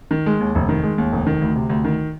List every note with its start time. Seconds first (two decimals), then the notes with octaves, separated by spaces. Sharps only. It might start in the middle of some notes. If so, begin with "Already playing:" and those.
0.11 D#3
0.26 G#3
0.40 D#2
0.55 F1
0.69 D#3
0.83 G#3
0.98 D#2
1.13 F1
1.27 D#3
1.42 D2
1.56 C3
1.69 D2
1.85 D#3